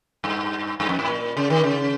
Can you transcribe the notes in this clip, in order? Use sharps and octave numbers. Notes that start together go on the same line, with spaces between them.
G2
G2
F2
G#2
A#2
C#3
D#3
C#3